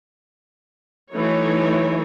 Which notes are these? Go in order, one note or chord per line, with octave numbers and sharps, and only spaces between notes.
E3 F#3 A3 D#4 C#5